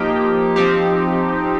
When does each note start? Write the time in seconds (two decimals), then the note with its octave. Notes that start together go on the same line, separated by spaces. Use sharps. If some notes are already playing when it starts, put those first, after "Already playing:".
Already playing: F3 A#3 D#4 G4
0.56 F3 C4 D#4 G4